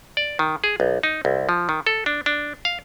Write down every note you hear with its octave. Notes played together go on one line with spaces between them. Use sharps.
D5
D#3
G#4
B1
D#4
C2
F3
D#3
A4
D4
D4
F5